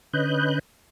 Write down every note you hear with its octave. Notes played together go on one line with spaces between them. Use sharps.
D3 C#4 B4 D#5 F#6 G6